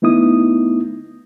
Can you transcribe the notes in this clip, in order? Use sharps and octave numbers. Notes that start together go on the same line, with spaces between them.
A3 B3 D#4 E4 D#6